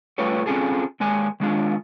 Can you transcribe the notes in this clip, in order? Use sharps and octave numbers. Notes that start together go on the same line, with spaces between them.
G3 A3 F4 G4 B4 C#5
C4 C#4 F4 G#4 A4
D#2 G#3 A#4 G#5
D#3 G#3 D4 F4